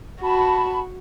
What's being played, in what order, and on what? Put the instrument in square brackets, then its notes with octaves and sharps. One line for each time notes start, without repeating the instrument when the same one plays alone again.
[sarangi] F#4 [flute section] A5 B5